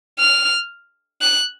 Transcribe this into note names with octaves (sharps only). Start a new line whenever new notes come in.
F6
F#6